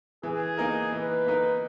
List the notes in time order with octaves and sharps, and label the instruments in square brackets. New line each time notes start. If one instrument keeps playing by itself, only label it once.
[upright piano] E3 [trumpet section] G#4
[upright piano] A#3 D#4 A#4
[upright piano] E3 [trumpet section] B4
[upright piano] A#3 D#4 A#4